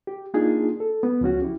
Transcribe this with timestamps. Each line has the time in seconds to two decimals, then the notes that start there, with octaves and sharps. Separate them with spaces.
0.07 G4
0.34 A#3 D4 D#4 F4 G#4
0.80 A4
1.03 B3
1.21 C#2 F3 C#4 F#4
1.42 E4 G4